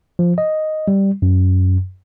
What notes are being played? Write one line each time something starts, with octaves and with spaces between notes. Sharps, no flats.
F3
D#5
G3
F#2